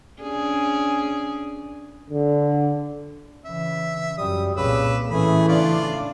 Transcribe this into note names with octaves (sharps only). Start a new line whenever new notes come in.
C#4 D4 G#4
D3
C#3 E3 E5
F#2 G3 D#6
C2 A#2 C#3 B4 D6 E6
A2 E3 A3 C#4 G#4 B5
C#3 D4 F4 D5